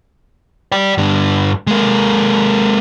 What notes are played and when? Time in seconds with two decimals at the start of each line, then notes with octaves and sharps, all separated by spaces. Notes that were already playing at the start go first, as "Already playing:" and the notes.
0.72 D5 G5
0.98 G2 D3
1.67 G#3 A#3